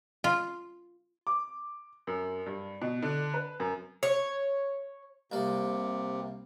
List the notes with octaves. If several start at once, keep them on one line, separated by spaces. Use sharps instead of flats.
F4
D6
F#2
G2
B2
D3
B4
F#2
C#5
C2 C3 A#3 D5